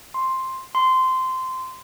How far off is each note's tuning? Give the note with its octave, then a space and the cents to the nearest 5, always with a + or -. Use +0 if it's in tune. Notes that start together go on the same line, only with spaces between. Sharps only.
C6 +5
C6 -15